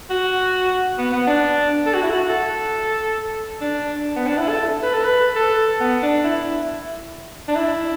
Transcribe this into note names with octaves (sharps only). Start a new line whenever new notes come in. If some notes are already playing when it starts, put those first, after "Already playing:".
F#4
B3
B3
D4
A4
F#4
E4
F#4
A4
D4
B3
D4
E4
A4
B4
A4
B4
A4
B3
D4
E4
D4
E4